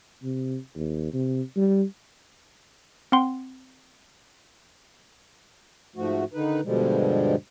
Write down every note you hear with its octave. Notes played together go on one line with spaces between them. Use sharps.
C3
D#2
C3
G3
C4 F#5 G5 C6
G#2 F3 A3 F#4
D3 D#3 D#4 B4
G2 B2 D3 F3 G3 G#3